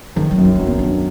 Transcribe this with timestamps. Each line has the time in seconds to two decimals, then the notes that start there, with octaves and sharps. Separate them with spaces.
0.16 D#3 F3
0.31 F#3
0.38 F#2
0.45 D#4
0.55 F#3 D4
0.67 B3
0.79 F#3 D4